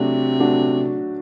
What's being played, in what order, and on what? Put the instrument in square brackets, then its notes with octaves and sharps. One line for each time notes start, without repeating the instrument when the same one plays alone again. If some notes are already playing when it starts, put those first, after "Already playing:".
Already playing: [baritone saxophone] C3 [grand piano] F#3 A3 D4 F#4
[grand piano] F#3 A3 D4 F#4